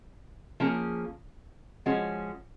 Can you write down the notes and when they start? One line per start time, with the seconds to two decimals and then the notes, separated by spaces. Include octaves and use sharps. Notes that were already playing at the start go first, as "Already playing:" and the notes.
0.60 F3 A#3 C#4 G#4
1.86 F3 G#3 C#4 F#4